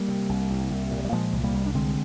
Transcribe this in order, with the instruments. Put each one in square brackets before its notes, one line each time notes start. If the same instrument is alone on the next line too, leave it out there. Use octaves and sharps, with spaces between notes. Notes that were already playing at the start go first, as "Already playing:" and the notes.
Already playing: [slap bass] G3 A#3
C3
C2
C2
C2
A#2
G3
A#2 F3 G#3
C2
G3 A#3
C2
D4
D3 G#3 C4